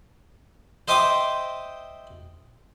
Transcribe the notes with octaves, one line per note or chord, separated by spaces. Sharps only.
C5 D#5 E5 G5 D6 D#6